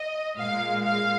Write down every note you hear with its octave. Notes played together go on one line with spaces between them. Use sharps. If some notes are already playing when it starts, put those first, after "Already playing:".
Already playing: D#5
A#2 G#3 F5
F5